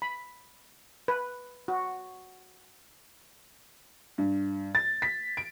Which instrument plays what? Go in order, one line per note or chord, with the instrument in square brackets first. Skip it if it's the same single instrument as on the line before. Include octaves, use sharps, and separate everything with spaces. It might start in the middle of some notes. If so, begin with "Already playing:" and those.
[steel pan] B5
B4
F#4
[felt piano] G2
A6
B6
D7